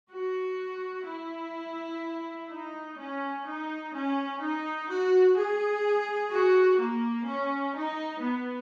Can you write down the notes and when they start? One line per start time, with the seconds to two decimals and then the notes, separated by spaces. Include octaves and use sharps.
0.13 F#4
1.08 E4
2.51 D#4
2.99 C#4
3.47 D#4
3.94 C#4
4.41 D#4
4.89 F#4
5.37 G#4
6.32 F#4
6.80 A#3
7.28 C#4
7.76 D#4
8.23 B3